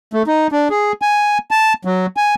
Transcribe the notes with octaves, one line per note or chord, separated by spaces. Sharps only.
A3
D#4
D4
G#4
G#5
A5
F#3
G#5